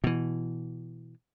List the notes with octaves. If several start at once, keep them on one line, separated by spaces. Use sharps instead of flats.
B2 E3